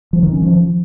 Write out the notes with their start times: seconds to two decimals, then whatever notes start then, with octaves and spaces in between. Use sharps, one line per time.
0.13 F3
0.23 D#3
0.32 C#4
0.42 F3